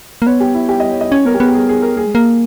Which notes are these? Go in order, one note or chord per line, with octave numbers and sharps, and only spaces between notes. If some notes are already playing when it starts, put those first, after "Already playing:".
A#3
B3 C#5
G4
E4
G4
D#5
C#5
D#5
C#4 C#5
B3 A#4
G4
B3 G#4
G4
G#4
G#4
A#4
A#3 G#4
G#3
A#3